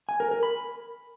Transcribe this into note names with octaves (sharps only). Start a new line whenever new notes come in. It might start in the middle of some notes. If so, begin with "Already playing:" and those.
G#5
A#4
A#4
B5